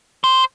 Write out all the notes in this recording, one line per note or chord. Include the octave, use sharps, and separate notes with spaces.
C5